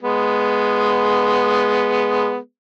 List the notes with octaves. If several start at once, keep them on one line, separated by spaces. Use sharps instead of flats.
G#3 B3